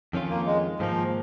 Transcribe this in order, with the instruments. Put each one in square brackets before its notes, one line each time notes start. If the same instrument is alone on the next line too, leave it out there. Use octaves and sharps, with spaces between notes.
[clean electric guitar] F2 D#3 C#4 F4
[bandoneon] A#3
G#3
[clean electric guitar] G#2 D#3 A#3 [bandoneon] F3